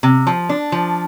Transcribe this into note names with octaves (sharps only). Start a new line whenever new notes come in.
C3
F3
D4
F3